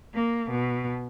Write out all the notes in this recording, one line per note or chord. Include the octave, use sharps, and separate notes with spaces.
A#3
B2